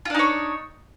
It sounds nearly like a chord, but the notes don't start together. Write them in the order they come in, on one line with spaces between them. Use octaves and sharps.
F4 D4 D#4 C#5